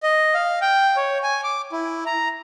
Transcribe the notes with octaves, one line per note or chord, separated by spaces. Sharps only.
D#5
F5
G5
C#5
G#5
D6
E4
A#5